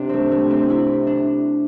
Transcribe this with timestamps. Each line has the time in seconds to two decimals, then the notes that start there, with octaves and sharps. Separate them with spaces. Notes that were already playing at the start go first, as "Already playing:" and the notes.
Already playing: C3 D4
0.09 A3 C4
0.31 A3
0.50 C4
0.70 E4
1.07 D4